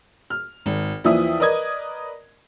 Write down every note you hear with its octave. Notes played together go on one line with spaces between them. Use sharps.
F6
G#1
D#2 E3 F3 D5 E5 D#6
A#4 B4 D5 D#5 D#6 G#6